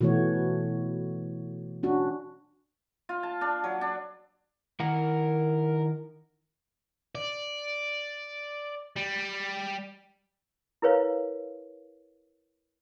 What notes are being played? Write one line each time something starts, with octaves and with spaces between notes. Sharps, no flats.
B2 E3 A3 F#4 C#5
C#4 D4 F#4
F4
A5
D4
F#3
D4
D#3 E4 A#4 F#5
D5
G3
E4 A#4 B4 C#5 F5